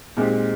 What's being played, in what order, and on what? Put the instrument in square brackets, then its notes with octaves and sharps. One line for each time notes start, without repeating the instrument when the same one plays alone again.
[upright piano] A#2 G#3 C4 D#4 G4